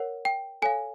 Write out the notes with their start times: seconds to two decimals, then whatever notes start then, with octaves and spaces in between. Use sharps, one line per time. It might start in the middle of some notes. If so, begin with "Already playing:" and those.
Already playing: A#4 C#5 F#5
0.25 G5
0.62 A4 C#5 F5 G#5